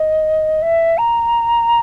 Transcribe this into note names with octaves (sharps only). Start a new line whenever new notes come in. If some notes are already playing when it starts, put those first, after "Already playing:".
Already playing: D#5
E5
A#5